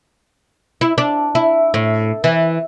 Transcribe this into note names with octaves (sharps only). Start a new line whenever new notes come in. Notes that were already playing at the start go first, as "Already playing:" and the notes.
E4
D4
E4
A2
E3